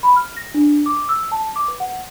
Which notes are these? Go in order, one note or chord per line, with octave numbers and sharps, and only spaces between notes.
B5
F6
A#6
D4
D6
E6
A5
D6
B4
F#5